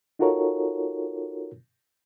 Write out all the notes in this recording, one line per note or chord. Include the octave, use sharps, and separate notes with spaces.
D#4 F4 F#4 A4 A#4 C#5